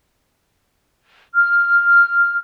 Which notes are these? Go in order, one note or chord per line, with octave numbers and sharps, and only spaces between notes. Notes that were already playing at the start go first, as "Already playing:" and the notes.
F6